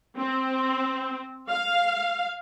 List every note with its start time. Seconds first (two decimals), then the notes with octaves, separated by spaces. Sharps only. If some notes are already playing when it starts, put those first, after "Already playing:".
0.17 C4
1.48 F5